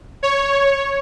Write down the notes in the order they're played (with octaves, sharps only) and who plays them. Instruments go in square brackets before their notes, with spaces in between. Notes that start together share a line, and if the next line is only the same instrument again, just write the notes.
[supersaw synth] C#5